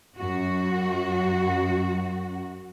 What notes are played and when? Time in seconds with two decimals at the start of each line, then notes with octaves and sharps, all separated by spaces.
0.17 F#2 F#4